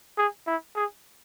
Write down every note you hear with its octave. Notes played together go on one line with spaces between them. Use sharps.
G#4
E4
G#4